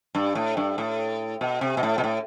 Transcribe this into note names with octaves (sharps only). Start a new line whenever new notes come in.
G2
A2
G2
A2
B2
C3
B2
A2
B2
A2